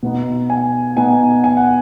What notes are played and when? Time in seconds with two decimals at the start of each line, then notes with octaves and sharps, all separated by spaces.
0.03 B2 B3 D#4
0.50 G#5
0.97 B2 B3 D#4 G#5
1.44 G#5
1.57 F#5